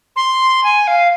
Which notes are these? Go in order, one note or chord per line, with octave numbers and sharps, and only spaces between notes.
C6
G#5
F5